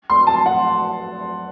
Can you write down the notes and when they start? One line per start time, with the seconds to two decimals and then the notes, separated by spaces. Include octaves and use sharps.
0.10 C6
0.27 A5
0.46 F#5